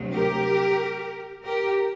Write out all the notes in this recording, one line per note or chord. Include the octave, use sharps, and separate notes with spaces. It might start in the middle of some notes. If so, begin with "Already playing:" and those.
Already playing: D2 C3 F#3
G4 A#4
G4 A#4